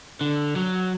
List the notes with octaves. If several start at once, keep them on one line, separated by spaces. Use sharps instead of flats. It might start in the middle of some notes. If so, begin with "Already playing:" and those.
D3
F#3